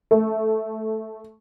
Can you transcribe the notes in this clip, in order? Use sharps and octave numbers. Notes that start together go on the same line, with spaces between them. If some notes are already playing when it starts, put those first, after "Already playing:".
A3